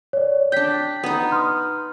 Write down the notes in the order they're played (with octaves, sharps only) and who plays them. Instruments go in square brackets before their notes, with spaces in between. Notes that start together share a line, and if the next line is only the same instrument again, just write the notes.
[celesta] C#5 D5
[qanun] D4 G5 [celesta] G6 B6
[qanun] B3 D#4
[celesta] C6 F6